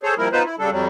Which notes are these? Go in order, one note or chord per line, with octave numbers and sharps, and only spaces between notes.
G#4 A4 C5 C#5
F3 G3 A#3 E4 A#4
B3 D#4 F4 B4 C5
E4
C#3 G3 D4 A4
F2 F#3 G3